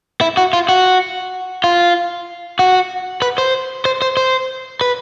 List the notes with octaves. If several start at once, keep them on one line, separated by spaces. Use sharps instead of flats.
E4
F#4
F4
F#4
F4
F#4
B4
C5
C5
C5
C5
B4